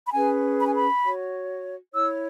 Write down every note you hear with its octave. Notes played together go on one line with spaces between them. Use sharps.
B5
C#4 G#4 B4 G#5
B5
G#5
B5
F#4 C#5
E4 C#5 E6